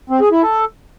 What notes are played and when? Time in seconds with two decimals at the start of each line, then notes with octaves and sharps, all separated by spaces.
0.10 C4
0.21 G#4
0.31 E4
0.42 A4